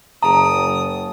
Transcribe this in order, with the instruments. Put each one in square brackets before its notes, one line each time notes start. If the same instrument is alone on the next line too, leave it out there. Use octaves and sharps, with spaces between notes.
[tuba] F#1 [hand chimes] G#4 A5 [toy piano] A#5 [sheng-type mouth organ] D#6